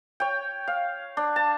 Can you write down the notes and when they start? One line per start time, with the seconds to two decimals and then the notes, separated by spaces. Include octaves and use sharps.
0.20 C#5 G5
0.68 F5
1.17 D4
1.36 A5